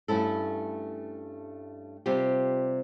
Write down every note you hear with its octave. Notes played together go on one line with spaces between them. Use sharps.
G2 A3 C#4 E4 A4
C3 G3 F4 G4